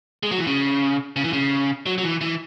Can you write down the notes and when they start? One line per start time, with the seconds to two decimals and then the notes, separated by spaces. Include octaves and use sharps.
0.23 G#3
0.32 F#3
0.38 E3
0.47 C#3
1.16 C#3
1.24 E3
1.33 C#3
1.86 F#3
1.98 F#3
2.03 E3
2.21 E3